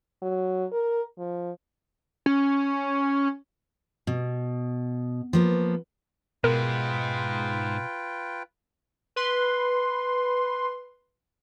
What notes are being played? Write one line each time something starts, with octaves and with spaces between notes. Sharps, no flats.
F#3
A#4
F3
C#4
B2
F3 A#3 B3
G#2 B2 G#3 F4 A#4 B4 G5
B4 C6